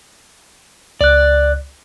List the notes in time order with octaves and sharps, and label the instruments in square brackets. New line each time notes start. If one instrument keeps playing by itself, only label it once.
[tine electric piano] C#2 F#6 [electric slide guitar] D5